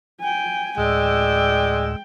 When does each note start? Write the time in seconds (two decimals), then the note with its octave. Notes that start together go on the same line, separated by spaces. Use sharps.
0.20 G5 G#5
0.78 D2 A2 G#3 D5 G5 E6